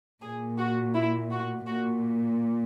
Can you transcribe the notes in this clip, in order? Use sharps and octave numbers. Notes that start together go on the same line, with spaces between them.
A#2 G#4
F#4
E4
F#4
A#2 F#4